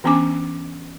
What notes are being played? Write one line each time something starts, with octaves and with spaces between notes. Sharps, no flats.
E3 B3 C#4 D4 G#5 D6